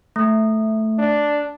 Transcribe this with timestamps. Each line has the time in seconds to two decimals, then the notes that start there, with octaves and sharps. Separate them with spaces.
0.16 A3
0.99 D4